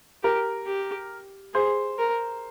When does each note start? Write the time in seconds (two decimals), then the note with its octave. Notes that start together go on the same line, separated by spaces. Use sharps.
0.24 G4 A#4
0.67 G4
1.54 G#4 C5
1.99 A#4